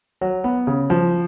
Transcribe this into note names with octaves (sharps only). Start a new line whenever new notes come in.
F#3
B3
C#3
F3